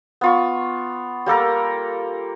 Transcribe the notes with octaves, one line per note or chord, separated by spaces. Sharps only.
B3 F4 C#6
G3 A#3 A4 A#4